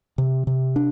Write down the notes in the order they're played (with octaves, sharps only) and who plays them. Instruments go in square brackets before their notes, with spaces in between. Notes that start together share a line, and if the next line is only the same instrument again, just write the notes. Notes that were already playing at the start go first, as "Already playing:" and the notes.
[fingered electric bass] C3
C3
D4